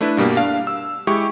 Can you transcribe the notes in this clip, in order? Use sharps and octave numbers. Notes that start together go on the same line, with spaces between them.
A3 D4 E4 B4
G2 B2 G3 A#3
D4 F5
E6
G#3 E4 G4 C#6